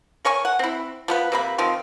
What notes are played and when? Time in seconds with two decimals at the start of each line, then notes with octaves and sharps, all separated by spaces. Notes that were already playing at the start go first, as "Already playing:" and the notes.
0.25 A#4 C#5 G#5 C#6
0.45 F#5
0.59 C4 E4
1.08 F3 B3 B4
1.32 C3 A#3 B5
1.58 D#3 F3 C4